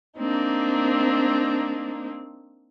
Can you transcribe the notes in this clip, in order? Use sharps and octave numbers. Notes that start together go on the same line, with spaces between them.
A#3 C4 D4 D#4